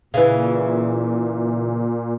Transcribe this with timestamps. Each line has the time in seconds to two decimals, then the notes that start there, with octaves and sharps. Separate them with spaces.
0.14 A#2 C#3 E3 B4 E5 F5